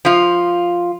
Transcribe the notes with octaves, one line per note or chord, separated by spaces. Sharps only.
F3 F4